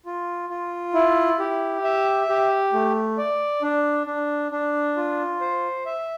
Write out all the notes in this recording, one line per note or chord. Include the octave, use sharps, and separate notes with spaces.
F4
F4
E4
G4
E5
G4
A3
D5
D4
D4
D4
F4
C5
E5